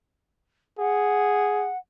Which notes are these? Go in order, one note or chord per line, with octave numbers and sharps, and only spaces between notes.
G#4 F#5